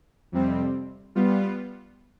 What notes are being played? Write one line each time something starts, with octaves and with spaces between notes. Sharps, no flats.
F2 C3 G3 C4
G3 B3 F4